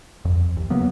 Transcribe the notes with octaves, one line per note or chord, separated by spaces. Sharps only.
F2
D#2
C#3 F#3 A#3 B3